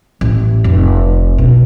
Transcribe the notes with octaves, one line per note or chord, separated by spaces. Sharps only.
A1
F1
B2